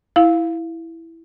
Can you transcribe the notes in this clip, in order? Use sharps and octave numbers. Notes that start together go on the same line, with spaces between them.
E4 F5